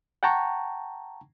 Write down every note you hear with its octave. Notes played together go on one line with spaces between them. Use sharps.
F#5 G5 A5 A#5 C#6